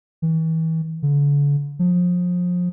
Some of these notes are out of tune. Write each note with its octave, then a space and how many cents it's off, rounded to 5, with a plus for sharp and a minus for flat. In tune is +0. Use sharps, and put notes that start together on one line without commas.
E3 -35
D3 -40
F3 +30